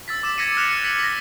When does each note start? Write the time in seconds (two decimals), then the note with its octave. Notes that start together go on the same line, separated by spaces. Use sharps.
0.08 E6 A6 B6
0.23 D6 E6 A6 E7
0.38 G#6 A#6 B6 C#7 D#7
0.57 F6 F#6 A6 C#7 E7 F7
0.84 B6 C#7 F#7
0.99 A#6 B6